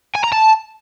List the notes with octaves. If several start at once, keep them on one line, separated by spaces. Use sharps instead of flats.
G#5
A#5
A5